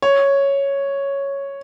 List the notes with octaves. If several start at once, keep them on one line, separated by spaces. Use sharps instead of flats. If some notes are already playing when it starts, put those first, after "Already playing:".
C#5